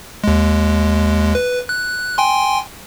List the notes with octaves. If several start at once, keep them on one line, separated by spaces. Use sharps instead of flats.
D#2 G#3
B4
F#6
G5 G#5 C6